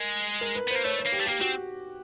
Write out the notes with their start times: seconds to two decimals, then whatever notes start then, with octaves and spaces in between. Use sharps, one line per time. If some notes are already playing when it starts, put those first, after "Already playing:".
Already playing: G#3 A#4
0.41 A#4
0.55 B4
0.68 B3 C5
0.75 A#3
0.84 A3 C#5
0.99 C#5
1.06 A#3
1.12 G4
1.20 A3
1.26 A#3 G4
1.41 C4 F#4